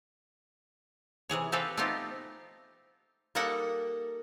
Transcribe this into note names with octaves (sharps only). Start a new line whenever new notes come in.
C3 E3 G#4 C#5
C4 G4 A4 B4 F5 G5
A3 B3 C4 D#4 F4 G4
G3 A#3 D#4 A4 A#4 F#5